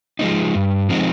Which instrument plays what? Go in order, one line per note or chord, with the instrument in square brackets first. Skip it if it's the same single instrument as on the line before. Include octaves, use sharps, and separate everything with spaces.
[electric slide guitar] F3 G#3 C4 D#4
G2
F3 G#3 C4 D#4